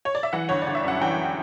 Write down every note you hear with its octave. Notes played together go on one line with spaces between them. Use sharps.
C#5
D5
E5
E3 F#5
G1 C#5
D5
G1
E5
F#2 F#5
E3 G5